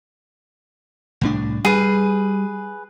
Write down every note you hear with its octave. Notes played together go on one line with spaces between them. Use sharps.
C2 A2 D4
G3 G#4 B4